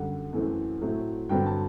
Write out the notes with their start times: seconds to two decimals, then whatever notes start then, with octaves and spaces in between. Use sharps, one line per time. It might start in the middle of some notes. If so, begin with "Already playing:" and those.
Already playing: F#2 D3 G3 F#5
0.33 F#2 E3 A3 C4
0.81 A2 F#3 A3 C4
1.29 G2 D3 F#3 C4 G5
1.46 A5